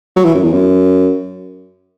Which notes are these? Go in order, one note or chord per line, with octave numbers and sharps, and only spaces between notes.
F#3
E3
F#2
E2
F#2